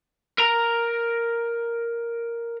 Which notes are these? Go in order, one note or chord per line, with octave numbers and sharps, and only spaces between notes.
A#4 A#5